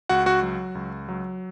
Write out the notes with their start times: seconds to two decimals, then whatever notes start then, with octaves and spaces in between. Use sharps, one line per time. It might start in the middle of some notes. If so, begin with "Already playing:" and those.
0.09 C#2 F#4 F#5
0.26 F#4 F#5
0.43 F#3
0.75 C#2
1.09 F#3